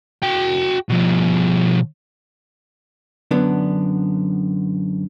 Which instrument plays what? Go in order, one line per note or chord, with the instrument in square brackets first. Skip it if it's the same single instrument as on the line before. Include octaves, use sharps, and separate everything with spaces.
[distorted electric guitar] F#4 G5
B2 F3
[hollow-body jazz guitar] F#2 D3 B3 D4